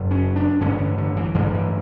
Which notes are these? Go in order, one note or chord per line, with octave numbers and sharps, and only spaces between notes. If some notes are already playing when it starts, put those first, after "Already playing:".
Already playing: F#1 F#2 C#3
C#4
D4
A1 G2 D3 C#4
D3
D3
E3
A1 G2 D3 E3
E3